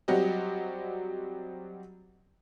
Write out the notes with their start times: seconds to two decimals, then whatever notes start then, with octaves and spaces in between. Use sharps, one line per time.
0.08 F#3 G3 C4 F#4 G4 D#5